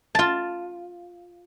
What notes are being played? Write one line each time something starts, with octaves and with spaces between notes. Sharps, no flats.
F4 A5